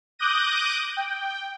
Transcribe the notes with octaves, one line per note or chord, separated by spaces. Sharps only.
D6 D#6 F#6 G6 A#6 D#7
G5